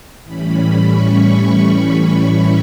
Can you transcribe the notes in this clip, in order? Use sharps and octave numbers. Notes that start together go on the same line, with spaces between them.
A2 E3 G3 C#4 B5
C#6
C#6